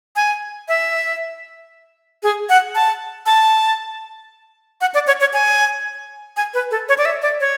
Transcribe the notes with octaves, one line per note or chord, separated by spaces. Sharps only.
G#5
E5
G#4
F#5
A5
A5
F#5
D5
C#5
C#5
G#5
G#5
B4
A4
C#5
D5
E5
D5
C#5